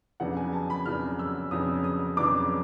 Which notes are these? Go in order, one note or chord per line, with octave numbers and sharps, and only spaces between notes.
F2 C#3 F#3 B3 D4 F#5
G#5
A5
B5
F2 C#3 F#3 B3 D4 F6
E6
F2 C#3 F#3 B3 D4 D#6
D#6
F2 C#3 F#3 B3 D4 D6